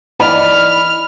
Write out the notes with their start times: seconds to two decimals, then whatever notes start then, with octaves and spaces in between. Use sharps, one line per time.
0.20 E3 D5 D#5 B5 F6